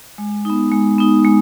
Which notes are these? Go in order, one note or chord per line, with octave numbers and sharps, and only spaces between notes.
G#3
B3 D#4
G#3
B3 D#4
G#3